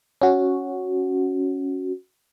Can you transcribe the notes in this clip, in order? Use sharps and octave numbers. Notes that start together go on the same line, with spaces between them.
C#4 F#4